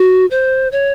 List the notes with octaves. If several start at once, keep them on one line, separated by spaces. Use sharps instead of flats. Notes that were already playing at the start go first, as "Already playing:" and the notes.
Already playing: F#4
C5
C#5